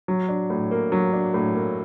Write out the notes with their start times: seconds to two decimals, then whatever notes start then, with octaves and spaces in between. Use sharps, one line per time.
0.08 F#3
0.28 D4
0.50 A2
0.71 A#3
0.92 F#3
1.13 D4
1.34 A2
1.55 A#3